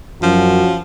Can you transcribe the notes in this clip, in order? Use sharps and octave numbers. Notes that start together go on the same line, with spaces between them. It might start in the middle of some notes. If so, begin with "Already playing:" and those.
F#2 F3 C#4 F#4